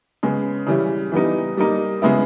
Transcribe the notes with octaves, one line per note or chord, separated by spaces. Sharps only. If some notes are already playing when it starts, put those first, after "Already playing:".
C#3 G#3 B3
C#3 E3 G3 C#4 E4
E3 G3 B3 D#4
G3 A#3 D#4
C#3 G#3 B3 E4